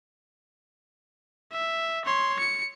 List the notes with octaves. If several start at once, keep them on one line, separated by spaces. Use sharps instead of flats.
E5
C#5 C6
C#7